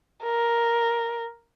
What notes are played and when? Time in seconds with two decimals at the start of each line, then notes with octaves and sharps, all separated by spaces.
0.24 A#4